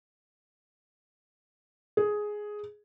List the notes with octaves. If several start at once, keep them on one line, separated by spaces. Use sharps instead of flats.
G#4